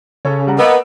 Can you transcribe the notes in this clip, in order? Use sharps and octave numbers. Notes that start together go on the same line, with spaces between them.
C#3 C#4 A4 C#5
G3 F#5 A#5
A#3 B3 D#5 E6 D7